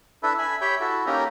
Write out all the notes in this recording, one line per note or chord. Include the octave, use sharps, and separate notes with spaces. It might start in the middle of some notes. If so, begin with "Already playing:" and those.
D4 E4 A4 B4 E5
E5 G#5 B5
G4 C#5 E5 G5 B5
E4 F#4 A4
A#3 C#4 D#4 G4 A#4 D#5